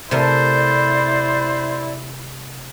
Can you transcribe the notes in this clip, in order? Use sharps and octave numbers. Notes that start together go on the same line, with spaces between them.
C3 A3 E4 A#4 C5 D5